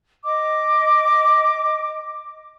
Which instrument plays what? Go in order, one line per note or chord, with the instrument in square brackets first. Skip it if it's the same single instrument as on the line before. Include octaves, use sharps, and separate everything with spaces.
[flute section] D#5 D6